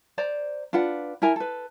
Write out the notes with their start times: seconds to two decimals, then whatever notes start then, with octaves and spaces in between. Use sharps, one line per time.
0.18 C5 D5 A#5
0.73 D4 F4 B4 F#5
1.22 E4 A#4 G#5 A#5
1.36 A4 B4